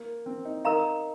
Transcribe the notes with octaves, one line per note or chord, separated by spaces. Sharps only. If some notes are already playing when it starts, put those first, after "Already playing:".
Already playing: A#3
C4
D#4
D#4 A#4 F5 A#5